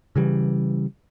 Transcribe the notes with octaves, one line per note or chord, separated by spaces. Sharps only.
C#3 E3 G3